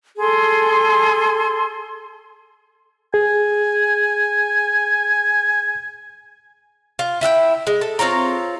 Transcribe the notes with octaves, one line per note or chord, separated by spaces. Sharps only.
G#4 A4 C6
G#4 G#5
F4
E4 E5 F#5 G5
G#3
A4
C4 F4 C#5 A#5